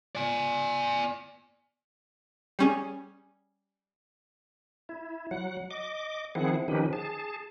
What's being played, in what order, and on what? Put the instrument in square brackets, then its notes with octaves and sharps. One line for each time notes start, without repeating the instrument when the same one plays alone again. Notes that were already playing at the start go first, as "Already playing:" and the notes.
[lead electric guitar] D5 G#5
[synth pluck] G3 C#4 G#4
[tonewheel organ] E4
F#3 F#5
D#5 D6
D#3 F3 C4 E4 G#4 F#5
D#3 F3 C#4 D#4 G4 B4
G#4 A5